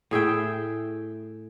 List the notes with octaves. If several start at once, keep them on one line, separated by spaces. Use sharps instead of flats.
A2 G#4 E5 G5